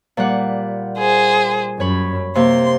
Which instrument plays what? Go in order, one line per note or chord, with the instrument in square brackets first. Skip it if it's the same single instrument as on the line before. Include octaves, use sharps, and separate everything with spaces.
[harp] A#2 G3 F#5
[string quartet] G#4 C5
[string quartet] F#2 [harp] C#5 B5
[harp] C3 A#3 [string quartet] C6